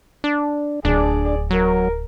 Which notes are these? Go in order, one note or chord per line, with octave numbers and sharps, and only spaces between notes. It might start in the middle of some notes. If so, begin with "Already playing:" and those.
D4
D1 D4 G#4 D5
F#3 A#4